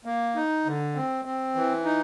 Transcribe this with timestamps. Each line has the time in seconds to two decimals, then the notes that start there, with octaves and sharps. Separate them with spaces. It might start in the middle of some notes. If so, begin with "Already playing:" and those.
0.05 A#3
0.35 D#4
0.65 D3
0.95 C4
1.25 C4
1.55 E3
1.85 D#4